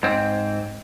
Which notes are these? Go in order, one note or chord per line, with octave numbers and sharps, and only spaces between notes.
G#2 C4